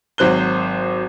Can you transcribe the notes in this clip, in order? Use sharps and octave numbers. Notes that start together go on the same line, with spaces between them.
G#1 F#3 C5 F#6 G7